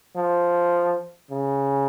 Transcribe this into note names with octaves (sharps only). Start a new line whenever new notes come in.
F3
C#3